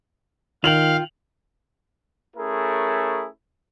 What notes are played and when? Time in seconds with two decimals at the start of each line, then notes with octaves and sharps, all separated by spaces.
0.64 D#3 F4 F5 G5 F7 F#7
2.37 A3 C#4 E4 G#4 A#4